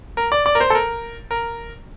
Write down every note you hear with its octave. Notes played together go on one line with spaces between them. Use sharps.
A#4
D5
D5
A#4
C5
A4
A#4
A#4